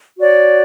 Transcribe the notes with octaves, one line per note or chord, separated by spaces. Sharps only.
F#4 C#5 D5